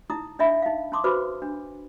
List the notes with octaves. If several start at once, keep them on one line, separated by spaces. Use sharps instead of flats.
D#4 E4 A#5 D#6
D4 D#5 E5 B5
D#4 F5
C#4 A5 C6 D6 D#6
F#4 B4 C5 B5 D6
D4